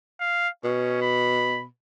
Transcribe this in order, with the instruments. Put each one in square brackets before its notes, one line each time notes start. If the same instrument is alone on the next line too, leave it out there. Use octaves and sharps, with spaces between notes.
[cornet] F5
[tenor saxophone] B2 [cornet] C#4
[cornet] B5